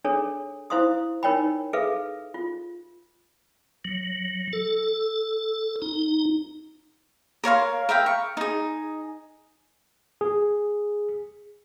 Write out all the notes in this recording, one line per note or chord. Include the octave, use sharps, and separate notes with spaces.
D4 G#4 A4 C#5
E4 C5 F5 C6 D#6
D#4 A#4 C#5 G5 B5
G#4 A4 B4 E5 F5
F4
F#3
A4
D#4
A#4 C#5 F5 C6
A#4 E5 F5 G5
C#6
D#4 G#4
G#4